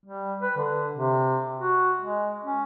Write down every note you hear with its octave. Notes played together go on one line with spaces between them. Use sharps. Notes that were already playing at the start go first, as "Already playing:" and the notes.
G3
B4
D3
C3
F#4
G#3
C#4